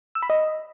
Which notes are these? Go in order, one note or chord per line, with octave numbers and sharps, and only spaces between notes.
E6
B5
D#5